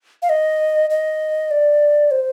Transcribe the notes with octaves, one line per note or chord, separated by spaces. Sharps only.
F5
D#5
D#5
D5
C5